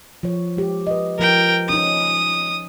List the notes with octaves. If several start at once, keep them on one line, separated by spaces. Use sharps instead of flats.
F3 C#5
G#3 G4
B4 D#5
F3 A#4 G5
C#4 D#4 D#6